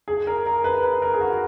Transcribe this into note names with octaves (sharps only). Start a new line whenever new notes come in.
G#4
A#4
A#4
B4
B4
A#4
G#4
F#4
F#4